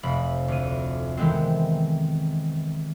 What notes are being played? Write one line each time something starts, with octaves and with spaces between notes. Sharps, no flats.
F1 B5
D2 D3 D#7
D#3 E3 G#3 B3 C4